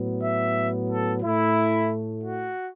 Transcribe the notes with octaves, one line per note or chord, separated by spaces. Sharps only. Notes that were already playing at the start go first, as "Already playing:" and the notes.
Already playing: A2 F#3 B3
E5
A4
A2 A3 E4
F#4